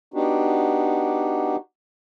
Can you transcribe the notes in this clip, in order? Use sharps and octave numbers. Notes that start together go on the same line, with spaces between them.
B3 D4 D#4 F#4 G4